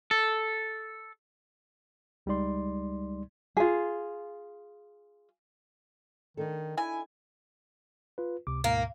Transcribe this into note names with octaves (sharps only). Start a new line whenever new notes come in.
A4
C#2 G3 G#3 D#4 D5 C6
F4 G#4
D#3 D4 D#4 A4
E4 G#5
F4 B4
C#2 C3 D6
D2 G#2 B2 A#3